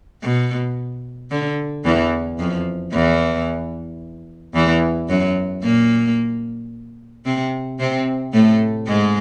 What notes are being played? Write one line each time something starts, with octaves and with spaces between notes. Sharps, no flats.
B2
D3
E2 E3
F2 F3
E2 E3
E2 E3
F#2 F#3
A#2 A#3
C3 C4
C3 C4
A2 A3
G#2 G#3